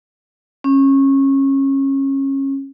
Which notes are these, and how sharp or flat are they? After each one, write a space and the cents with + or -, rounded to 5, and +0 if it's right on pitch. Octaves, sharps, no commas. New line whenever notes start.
C#4 -25